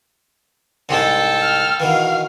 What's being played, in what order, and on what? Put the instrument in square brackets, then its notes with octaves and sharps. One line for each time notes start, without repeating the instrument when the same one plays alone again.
[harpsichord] C2 G#2 G#3 [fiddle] A4 G5
[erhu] F6
[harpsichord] B2 D#3 E3 [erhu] F5